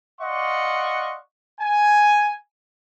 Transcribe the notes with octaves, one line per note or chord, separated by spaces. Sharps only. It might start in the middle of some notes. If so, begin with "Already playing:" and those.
D5 D#5 F5 F#5 C6 C#6
G#5